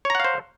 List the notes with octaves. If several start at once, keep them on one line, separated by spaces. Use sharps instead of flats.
C5 C#5 F5 F#5 A#5